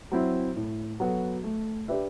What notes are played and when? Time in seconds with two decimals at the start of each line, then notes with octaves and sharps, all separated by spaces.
0.12 F#3 C4 E4
0.56 A2
1.00 F#3 B3 F#4 A4
1.44 A3
1.88 D4 G4 B4 E5